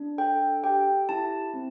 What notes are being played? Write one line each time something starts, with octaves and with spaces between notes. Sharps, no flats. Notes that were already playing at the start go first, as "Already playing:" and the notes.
Already playing: D4
A4 G5
G4 G5
E4 A5
C4